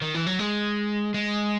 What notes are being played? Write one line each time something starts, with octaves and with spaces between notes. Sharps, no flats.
D#3
E3
F#3
G#3
G#3